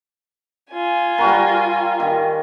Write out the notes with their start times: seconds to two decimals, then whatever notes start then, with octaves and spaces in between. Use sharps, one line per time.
0.71 F4 G#5
1.18 G3 F#4 A#4
2.00 D#3